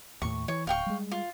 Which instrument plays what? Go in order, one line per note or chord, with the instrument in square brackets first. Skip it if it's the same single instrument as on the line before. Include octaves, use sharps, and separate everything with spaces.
[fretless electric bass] D#2 A2 [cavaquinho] C#6
[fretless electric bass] E3 [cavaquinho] C#5
[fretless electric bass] D1 [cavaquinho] F5 G5 C#6
[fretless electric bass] G3 G#3
[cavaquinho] F4